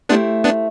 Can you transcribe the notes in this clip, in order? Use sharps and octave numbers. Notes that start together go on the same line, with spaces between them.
A3 B3 D4 E4 G4 C5
B3 D4